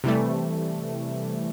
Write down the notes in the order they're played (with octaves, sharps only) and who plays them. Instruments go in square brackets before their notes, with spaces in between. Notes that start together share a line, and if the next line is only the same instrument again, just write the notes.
[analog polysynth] C3 E3 G3 A3